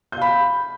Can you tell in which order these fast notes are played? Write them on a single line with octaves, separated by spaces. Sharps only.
G6 F5 B5